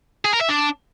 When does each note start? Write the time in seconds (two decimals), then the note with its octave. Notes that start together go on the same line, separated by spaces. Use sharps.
0.25 G#4
0.33 A#4
0.41 E5
0.49 D4